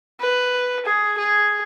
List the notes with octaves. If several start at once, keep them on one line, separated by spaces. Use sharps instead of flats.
B4
G#4
G#4